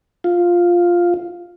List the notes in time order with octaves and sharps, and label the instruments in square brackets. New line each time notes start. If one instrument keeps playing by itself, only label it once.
[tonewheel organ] F4